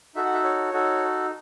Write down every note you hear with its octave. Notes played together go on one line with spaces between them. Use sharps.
D#4 F#4 A4 E5
F#5
E5
C#5
D#4 F#4 A4